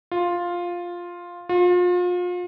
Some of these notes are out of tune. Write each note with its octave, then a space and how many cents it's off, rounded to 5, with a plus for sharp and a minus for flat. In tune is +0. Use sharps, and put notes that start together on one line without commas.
F4 +5
F4 +35